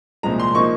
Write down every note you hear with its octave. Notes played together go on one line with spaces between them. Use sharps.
C2 A#2 F3 G#3 A#5
C6
F3 A#3 D#4 C#6